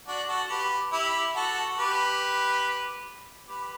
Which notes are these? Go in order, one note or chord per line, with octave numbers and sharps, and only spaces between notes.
D4 F#4
F#4 A4
G4 B4
E4 G4
F#4 A4
G4 B4
G4 B4